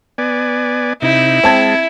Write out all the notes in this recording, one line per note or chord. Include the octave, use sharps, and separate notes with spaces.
B3 D5 G#5
C3 D#4 E4
G#3 C4 A5 G#6